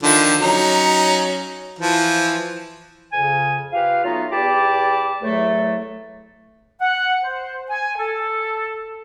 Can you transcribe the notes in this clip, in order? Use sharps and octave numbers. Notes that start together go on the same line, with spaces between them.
D3 D#3 F3
F#3 C#4 D#4
E3 F3
F2 C#3 G#5
F4 G4 B4 F5
F#3 A3 B3 D#4 F4
E2 G4 D5 A5 B5 D6
E2 A2 F#3 A3
F#5
C5
G#5
A4